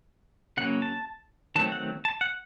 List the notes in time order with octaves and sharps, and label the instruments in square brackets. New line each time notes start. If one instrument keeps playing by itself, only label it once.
[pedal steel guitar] C#3 F#3 A#3 C#4 F#5
A5
D#3 F#3 A3 C4 A5
F#5
A5
F#5